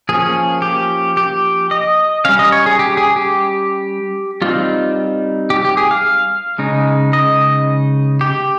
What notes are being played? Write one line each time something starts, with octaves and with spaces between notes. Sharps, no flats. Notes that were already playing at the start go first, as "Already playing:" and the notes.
F3 A#3 C#4 G#4
G4
G4
D#5
G3 C#4 F5
D#5
C#5
G#4
G4
G#4
G4
G3 C4 D#4 F4
G4
G4
G#4
F5
C#3 G#3 D#4
D#5
G4